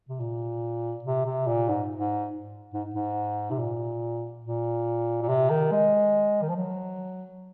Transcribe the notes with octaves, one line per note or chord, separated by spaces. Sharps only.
C3
A#2
C3
C3
A#2
G#2
G#2
G#2
G#2
C3
A#2
A#2
A#2
C3
D#3
G#3
D#3
F3
F#3